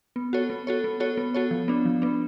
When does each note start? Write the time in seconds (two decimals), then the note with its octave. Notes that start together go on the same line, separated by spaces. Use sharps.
0.16 B3
0.33 F#4 A4 C#5
0.50 B3
0.67 F#4 A4 C#5
0.84 B3
1.00 F#4 A4 C#5
1.17 B3
1.34 F#4 A4 C#5
1.51 F3
1.68 B3 D4
1.85 F3
2.02 B3 D4